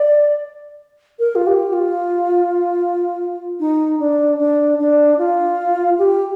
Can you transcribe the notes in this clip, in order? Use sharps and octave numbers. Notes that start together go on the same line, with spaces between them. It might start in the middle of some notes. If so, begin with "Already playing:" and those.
Already playing: D5
A#4
F4
G4
F4
D#4
D4
D4
D4
F4
G4